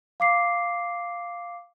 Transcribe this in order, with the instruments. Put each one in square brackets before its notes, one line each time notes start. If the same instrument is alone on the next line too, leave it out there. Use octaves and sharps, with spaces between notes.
[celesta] F5 D6 C7